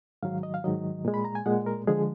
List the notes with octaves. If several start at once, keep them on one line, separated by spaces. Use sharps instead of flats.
G#2 D#3 F#3 F5
D#5
F5
G#2 D#3 F#3 D#5
A#2 G#3
B5
A#5
G#5
A#2 G#3 F#5
A#4
D3 F3 G#3 G#4